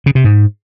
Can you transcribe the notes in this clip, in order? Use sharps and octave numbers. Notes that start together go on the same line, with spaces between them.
C#3
C3
G#2